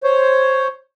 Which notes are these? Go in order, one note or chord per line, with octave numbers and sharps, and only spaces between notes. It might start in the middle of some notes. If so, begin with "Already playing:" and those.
C5 C#5